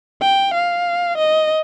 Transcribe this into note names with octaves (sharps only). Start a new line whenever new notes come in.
G5
F5
D#5